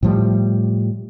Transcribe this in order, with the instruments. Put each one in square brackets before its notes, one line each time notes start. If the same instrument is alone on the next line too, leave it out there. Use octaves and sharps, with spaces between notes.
[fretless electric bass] A2 F3 G3